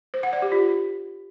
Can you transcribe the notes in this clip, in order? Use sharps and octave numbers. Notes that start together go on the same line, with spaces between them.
C5
F#5
D5
G4
F4